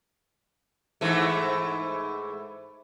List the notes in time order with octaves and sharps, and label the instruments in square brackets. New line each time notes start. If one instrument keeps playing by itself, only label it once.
[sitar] G#2 E3 A3